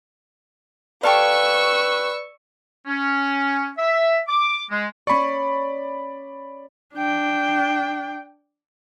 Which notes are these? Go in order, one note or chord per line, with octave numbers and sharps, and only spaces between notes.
G4 A4 B4 D5 F5 C#6 E6
C#4
E5
D6
G#3
C#4 D5 B5 C#6
D4 G5